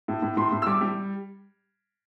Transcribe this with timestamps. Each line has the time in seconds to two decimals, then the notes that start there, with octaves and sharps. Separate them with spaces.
0.08 A2
0.22 A2
0.37 A2 C6
0.52 A2
0.62 E6
0.66 G3 D6
0.81 G3